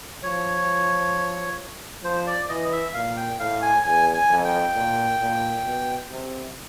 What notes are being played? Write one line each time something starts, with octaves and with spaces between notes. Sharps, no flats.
F3 C#5
F3 C5
D5
E3 D#5
E5
A#2 F5
G5
A2 F5
G#5
E2 G#5
G#5
F2
G5
A#2
A#2
B2
C3